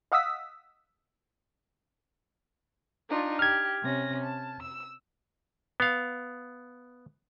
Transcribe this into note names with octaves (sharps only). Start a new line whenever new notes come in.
D#5 F5 F#5 D#6 E6 B6
D4 D#4 F4
G4 F6 G#6
C3 C#4 A#6
A5
E6
B3 F5